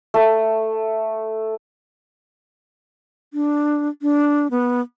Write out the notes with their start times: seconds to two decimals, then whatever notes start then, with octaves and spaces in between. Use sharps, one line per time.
0.14 A3
3.34 D4
4.02 D4
4.51 B3